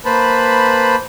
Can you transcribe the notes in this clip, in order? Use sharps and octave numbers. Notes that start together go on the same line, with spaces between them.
A#3 B4 C5 A5 B5